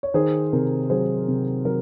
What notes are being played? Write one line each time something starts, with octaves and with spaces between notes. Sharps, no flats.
C#5
D#3 G#4 C5
C3 A#4
F#3 G#4 C5
C3
F#3 A#4